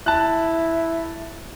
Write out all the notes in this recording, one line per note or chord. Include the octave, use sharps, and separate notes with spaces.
E4 A5 F#6